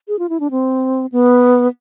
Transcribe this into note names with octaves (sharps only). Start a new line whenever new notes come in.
G#4
F4
E4
D4
C4
B3